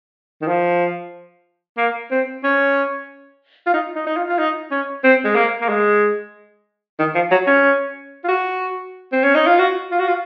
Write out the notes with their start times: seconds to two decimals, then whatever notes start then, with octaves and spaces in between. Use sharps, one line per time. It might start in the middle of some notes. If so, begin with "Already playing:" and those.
0.42 D#3
0.48 F3
1.78 A#3
2.11 C4
2.44 C#4
3.67 F4
3.74 D#4
3.95 D#4
4.07 D#4
4.16 F4
4.29 F4
4.39 D#4
4.71 C#4
5.04 C4
5.25 G#3
5.35 A#3
5.61 A#3
5.69 G#3
6.99 D#3
7.15 F3
7.31 F#3
7.47 C#4
8.24 F4
8.28 F#4
9.12 C4
9.24 C#4
9.35 D#4
9.47 F4
9.59 F#4
9.91 F4
9.99 F#4
10.07 F4